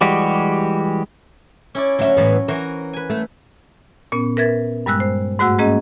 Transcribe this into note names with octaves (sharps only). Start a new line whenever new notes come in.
E3 G3 G#3 F#4 G4
C#4 E4 D5
D2 F#3 C#4 E5
A2 E3 B3
E3 F#4 A#4 C5
B4 G#5
A3
A#2 B3 C#4
A#4 B4 E5 G#6 A6
G2 G3 G#3 E6 F#6
C5
G#2 A3 F#4 F#5 E6
G#3 A#3 C#4 G#4 D#5